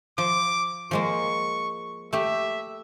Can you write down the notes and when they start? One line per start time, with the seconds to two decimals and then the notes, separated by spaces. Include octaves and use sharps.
0.18 F3 D6
0.91 F3 G#3 A#3 C#6
2.13 A3 G4 E5